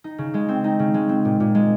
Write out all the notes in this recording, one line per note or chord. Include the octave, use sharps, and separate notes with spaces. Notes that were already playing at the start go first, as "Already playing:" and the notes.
D#4
C#3
G#3
C4
D#4
C#3
G#3
C4
A#2
A#2
G#3